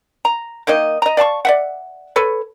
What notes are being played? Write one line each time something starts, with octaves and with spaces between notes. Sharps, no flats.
A#5
D#3 A#3 D#4 D#5
D#5 A#5
D5 F5 A5 C#6
D5 E5 F#5
A4 B4 C#5